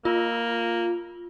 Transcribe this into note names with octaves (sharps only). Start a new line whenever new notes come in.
A#3 F4